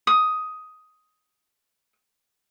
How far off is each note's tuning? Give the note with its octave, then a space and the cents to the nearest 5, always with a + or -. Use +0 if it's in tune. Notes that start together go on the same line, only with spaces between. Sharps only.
D#6 +10